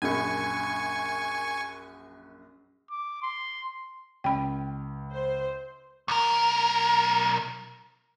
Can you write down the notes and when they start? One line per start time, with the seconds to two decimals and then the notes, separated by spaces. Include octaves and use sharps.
0.02 A#1 F#2 G#5 C#6
2.90 D6
3.22 C6
4.24 C#2 G5 B5
5.14 C5
6.08 B1 A#4